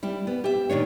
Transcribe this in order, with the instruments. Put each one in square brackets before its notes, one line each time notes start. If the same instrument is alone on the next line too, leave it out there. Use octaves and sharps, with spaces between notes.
[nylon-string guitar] G3 E4 G4
B3
G4 E5
A#2 D#3 D4 C#5